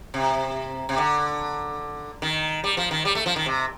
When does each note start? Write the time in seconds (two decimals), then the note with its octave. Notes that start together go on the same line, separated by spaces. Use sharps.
0.14 C3
0.89 C3
0.98 D3
2.22 D#3
2.64 G3
2.77 F3
2.91 D#3
3.05 G3
3.15 A3
3.26 F3
3.36 D#3
3.46 C3